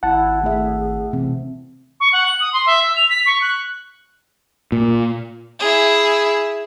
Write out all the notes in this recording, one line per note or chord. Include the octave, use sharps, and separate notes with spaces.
G#1 E4 F#5 A5
A3 E4 G#4 E5
C3 E3 C4
C#6
F#5
F#7
D#6
C6
E5
E6
F7
B6
C#6
F#6
A#2
E4 G#4